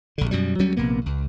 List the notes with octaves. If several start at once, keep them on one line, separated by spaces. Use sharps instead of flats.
A#1 D3
F#2 B2 G3
D2 F#3 G3 C#4
A#1 C3 A#3 B3
C#2